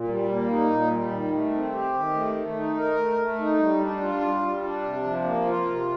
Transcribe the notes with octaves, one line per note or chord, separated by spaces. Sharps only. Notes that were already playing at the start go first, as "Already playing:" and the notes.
Already playing: A#2
G3
A#3
D#4
A#2
G3
D#3
A3
C4
G4
D#3
A3
A3
D#4
A#4
A3
A3
D#4
G3
D4
F4
G3
G3
D4
C3
F3
A#3
F4
C3